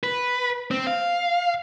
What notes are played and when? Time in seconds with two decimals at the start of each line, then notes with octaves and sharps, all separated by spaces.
0.04 B4
0.71 C4
0.87 F5